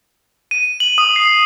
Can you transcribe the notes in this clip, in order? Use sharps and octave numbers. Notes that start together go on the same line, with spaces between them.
D#7
F#7
D#6
C7